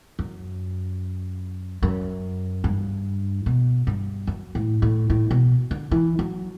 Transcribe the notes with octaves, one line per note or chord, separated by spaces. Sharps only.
F#2
F#2
G2
B2
G2
F#2
A2
A2
A2
B2
D3
E3
F#3